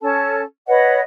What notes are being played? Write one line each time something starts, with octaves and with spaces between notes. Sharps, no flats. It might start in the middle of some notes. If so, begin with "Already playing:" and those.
C#4 A4 A5
B4 C#5 D#5 F#5